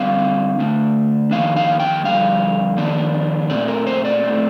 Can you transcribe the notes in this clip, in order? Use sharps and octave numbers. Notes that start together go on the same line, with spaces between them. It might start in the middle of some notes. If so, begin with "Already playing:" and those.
Already playing: D3 G3 C4 F5
D3 A3 D4
F2 D#3 A#3 D4 F5
F5
G5
F2 D3 G3 F5
F2 D#3 A#3 D4
A#2 A3 C4 D5
A#4
C5
D5
A2 A3 C4